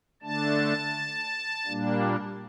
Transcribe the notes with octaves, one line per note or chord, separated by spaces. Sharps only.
D3 A3 D4 A5
A#2 G3 A#3 D4